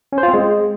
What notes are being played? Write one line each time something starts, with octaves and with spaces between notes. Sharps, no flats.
C#4
C5
F4
C4
G#3